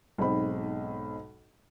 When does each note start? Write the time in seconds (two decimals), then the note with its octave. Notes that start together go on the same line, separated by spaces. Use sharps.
0.18 B1 G#2 C4 D#5 B5